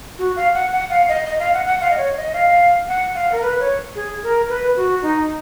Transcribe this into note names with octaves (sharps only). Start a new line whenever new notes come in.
F#4
F5
F#5
F#5
F5
D#5
D#5
F5
F#5
F#5
F5
D#5
C#5
D#5
F5
F#5
F5
A#4
B4
C#5
G#4
A#4
B4
F#4
D#4